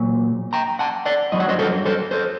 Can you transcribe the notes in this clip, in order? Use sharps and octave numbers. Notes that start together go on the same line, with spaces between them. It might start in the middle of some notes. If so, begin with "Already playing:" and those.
Already playing: A#2 F#3
G5 A#5
F#5 A5
D5 F#5
G2 F#3 D#5
F#5
C5 D#5
A4 C5
A4 C5
A4 C5